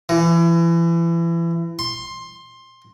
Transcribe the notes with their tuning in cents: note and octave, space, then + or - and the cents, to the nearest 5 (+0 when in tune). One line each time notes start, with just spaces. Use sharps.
E3 +30
C6 +15